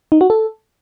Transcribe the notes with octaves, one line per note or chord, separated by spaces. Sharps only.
D#4
F#4
A4